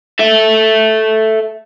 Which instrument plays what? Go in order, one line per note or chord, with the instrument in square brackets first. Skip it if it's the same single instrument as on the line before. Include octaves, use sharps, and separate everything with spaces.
[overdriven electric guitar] A4 E5